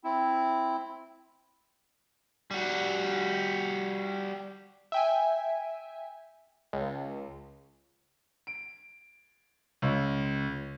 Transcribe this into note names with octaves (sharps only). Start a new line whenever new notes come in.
C4 E4
G3 F#4
E5 G5 G#5
C#2
D7
C#2